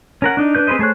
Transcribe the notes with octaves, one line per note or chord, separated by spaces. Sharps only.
C#4 A#4 F#5
D4 D#4
D4 B4 G6
C4 G#4 B4 C5 D#5
A3 G#4 C5 C#5 F#6